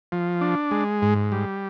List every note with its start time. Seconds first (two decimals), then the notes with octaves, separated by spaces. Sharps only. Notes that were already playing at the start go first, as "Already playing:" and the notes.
0.12 F3
0.41 D4
0.71 G#3
1.02 G#2
1.32 G3